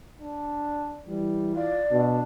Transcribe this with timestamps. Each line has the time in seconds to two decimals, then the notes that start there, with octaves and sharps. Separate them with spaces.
0.21 D4
1.09 E3 G3
1.55 F4 D5
1.92 B2 D4